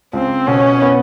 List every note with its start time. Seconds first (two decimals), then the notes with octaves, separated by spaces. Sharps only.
0.13 C#2 C4
0.47 B2 C#4
0.82 B3